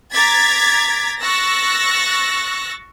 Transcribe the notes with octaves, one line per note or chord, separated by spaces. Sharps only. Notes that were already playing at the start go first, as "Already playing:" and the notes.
A#5 D6 G#6 A6 B6
C#6 E6 F#6 A6 A#6